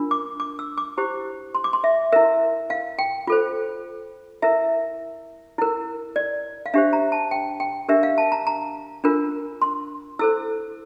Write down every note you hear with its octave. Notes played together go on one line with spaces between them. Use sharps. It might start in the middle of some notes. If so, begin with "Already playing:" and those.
Already playing: D4 F4 A#4
D6
D6
E6
D6
E4 G4 C5
C6
D6
C6
E5
E4 A#4 E5
F5
G5
F4 A4 C5
E4 A#4 E5
E4 A#4
D5
F5
D4 G4 C5 E5
A#5
A5
G5
G5
D4 G4 A#4 E5
F5
A5
A#5
A#5
D4 F4 A#4
C6
E4 A4 C5 E6